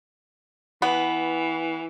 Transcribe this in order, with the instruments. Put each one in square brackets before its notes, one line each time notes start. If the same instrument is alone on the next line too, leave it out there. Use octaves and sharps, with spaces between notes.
[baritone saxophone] E3 [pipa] B3